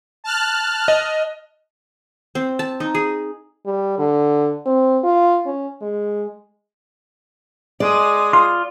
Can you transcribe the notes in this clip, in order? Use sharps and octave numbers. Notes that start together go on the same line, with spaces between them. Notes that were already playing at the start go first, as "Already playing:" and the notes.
A5 F6 F#6
D#5
C4
A5
D#4
G#4
G3
D3
C4
F4
C#4
G#3
G#3 D5 D#6
F4 C6